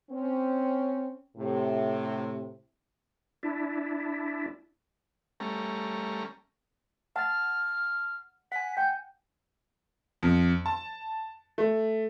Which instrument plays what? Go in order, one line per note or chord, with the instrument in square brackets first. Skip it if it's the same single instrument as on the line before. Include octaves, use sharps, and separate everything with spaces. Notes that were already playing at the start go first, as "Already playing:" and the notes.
[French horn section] C4 C#4
A2 C3
[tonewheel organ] D4 E4
[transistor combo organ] G3 A3 C#4 A#5
[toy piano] F#5 [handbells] A5 A6 [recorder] F6
[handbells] F#5 G#5 [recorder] B6
[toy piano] G5 [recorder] G6
[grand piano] F2
A5
A3